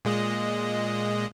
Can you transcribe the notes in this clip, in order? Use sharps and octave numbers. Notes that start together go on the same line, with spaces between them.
A#2 G#3 D#5